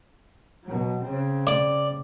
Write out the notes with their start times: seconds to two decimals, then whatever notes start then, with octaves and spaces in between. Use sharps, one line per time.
0.64 B2 F#3
1.02 C#3 C4
1.47 D5